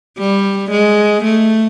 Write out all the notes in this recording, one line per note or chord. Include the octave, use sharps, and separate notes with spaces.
G3
G#3
A3